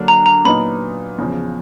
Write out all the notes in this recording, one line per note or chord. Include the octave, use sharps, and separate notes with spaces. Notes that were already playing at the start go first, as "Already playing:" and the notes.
Already playing: D3 F#3 A#3 D4
A#5
A#5
A#2 F#3 B3 D#4 B5
E2 C#3 F3